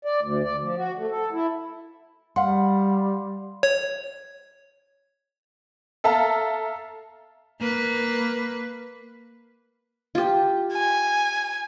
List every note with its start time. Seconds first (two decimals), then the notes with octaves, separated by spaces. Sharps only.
0.05 D5
0.22 D2
0.44 D5
0.62 F3
0.77 F#4
0.97 A3
1.11 A4
1.32 E4
2.36 G3 F5 F#5 C6
3.63 C#5
6.04 A4 E5 F5 A5 A#5
7.60 A#3 B4
10.15 F4 G4
10.73 G#5